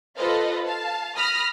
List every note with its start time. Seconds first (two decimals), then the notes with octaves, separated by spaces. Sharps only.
0.16 F4 A4 B4 C5 D#5 F5
0.65 F5 A5
1.16 B5 D#6 F6 A#6